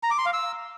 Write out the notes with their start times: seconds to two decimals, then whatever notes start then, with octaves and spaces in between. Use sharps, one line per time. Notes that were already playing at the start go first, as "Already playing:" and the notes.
0.03 A#5
0.11 D6
0.18 C6
0.26 F5
0.33 E6